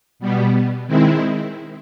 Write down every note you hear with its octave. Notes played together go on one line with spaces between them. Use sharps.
B2 G3 B3
D#3 G#3 C4 E4